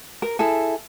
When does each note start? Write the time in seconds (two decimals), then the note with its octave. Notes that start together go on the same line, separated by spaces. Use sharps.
0.22 A#4
0.39 E4 G#4 A4